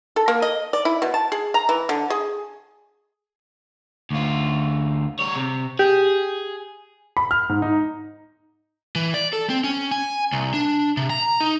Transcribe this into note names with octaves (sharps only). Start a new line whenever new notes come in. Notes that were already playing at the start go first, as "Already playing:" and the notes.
A4
A#3
D#5
D5
E4
B2
A5
G#4
A#5
E3
D3
G#4
D2 F4
G3 C#5
C3
G4 G#4
B5
F6
G#2
D#4
E3
D5
A4
C4
C#4
G#5
C2
D4
C3
A#5
D#4